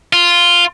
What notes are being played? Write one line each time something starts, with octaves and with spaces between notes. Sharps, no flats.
F4